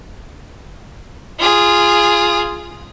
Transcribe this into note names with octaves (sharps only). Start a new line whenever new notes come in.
F4 G#4